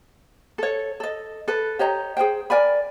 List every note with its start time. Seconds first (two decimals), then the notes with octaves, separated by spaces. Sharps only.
0.58 A4 C#5
1.00 A4 D#5
1.48 A4 B4
1.79 G4 C#5 D#5 A#5
2.17 G#4 A#4 C5 G5
2.50 A#4 D5 G#5 B5